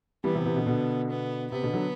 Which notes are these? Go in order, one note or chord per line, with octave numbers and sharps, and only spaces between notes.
E3 G3 B3
C3 E3
C3 E3
B2 D3
B2 D3
B3
C3 B3
B2 D3
D3 F#3